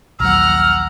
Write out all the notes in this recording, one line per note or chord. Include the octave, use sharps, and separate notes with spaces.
A#1 D#2 F#3 F#5 A#5 E6 F6